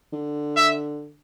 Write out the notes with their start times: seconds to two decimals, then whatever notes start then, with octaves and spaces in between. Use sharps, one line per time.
0.13 D3
0.56 E5